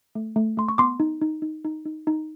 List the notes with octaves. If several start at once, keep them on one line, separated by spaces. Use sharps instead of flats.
A3
A3
A3 C6
C#6
B3 C6 D6
D#4
D#4
D#4
D#4
D#4
D#4